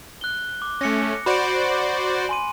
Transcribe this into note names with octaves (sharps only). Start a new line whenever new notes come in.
F#6 G7
D6
A3 C#4 A#6 C#7
F#4 C5 D5 B5 D7
G#5 C6 D#7